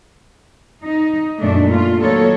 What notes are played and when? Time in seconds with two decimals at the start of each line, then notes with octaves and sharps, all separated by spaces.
0.83 D#4
1.39 F#2 A#2 A3 D4
1.71 F4
2.02 D#3 F#3 A#3 A4 C#5